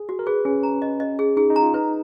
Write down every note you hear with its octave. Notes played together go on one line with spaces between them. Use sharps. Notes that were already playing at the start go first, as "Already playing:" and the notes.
Already playing: G#4
F#4
A#4
G#4 B4
C#4 G#4
A#5
D#5
D#5
G#4
D#4 G#4
D#4
A#5
F4
D#4 B4